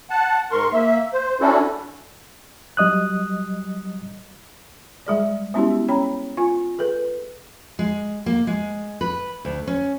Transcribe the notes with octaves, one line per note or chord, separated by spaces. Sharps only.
F#5 A5
G#2 A#4 C6 C#6
A#3 E5
C5
C#4 D4 E4 F#4 A4
F#3 G3 D#5 D#6 F#6
G3 G#3 G#4 D5
G#3 B3 C#4 E4 F#4 G4
C#4 C#5 G5 A#5 B5
F4 G#5
G#4 A4 B4
G#3
A#3
G#3
B4
D2
C#4